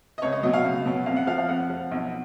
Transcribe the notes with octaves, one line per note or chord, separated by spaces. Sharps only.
D#5
C#2 C#5
D#5
B2 F#3 D#5
F5
C#2
B2 F#3
F2 F5
F#5
F3 F5
F5
F2 F#5
F3
B1